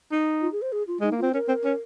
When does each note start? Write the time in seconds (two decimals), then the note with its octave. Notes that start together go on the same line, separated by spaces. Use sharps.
0.11 D#4
0.41 F4
0.52 G#4
0.62 C5
0.72 G#4
0.87 F4
1.01 G#3 D#4
1.11 A#3
1.18 C4 F4
1.34 C#4 A#4
1.48 C4
1.64 C#4